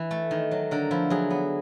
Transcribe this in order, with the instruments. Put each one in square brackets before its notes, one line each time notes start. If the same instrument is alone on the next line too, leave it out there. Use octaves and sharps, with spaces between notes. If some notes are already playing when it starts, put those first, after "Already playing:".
Already playing: [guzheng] E3
A3
D#3
F#3
D3 A#4
F3 E4
F#3 G#4
B3